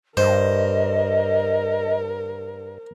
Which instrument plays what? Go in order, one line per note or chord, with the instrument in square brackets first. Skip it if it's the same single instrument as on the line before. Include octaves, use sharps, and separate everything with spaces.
[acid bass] G2 [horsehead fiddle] A#4 [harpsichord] C5 [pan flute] D#5